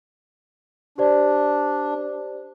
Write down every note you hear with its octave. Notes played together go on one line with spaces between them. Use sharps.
D4 G4 C5 D5